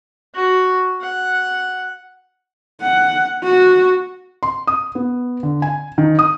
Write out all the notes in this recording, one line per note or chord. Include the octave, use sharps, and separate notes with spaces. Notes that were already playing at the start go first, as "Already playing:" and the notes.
F#4
F#5
F#5
F#4
C6
D#6
B3
D3
G#5
D#3
D#6